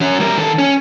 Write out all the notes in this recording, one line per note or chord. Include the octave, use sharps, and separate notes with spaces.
F#3 C#4
G3 A#4
D#3 A4
C#4